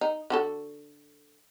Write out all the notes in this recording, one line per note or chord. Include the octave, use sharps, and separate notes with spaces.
D#4
D3 F#4 A4